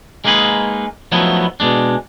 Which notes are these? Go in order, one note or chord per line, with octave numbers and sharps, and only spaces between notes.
G#3 A#3 D#4 G#4 B4
F3 F#3 A3 B3 D#4 E4
B2 G#3 D4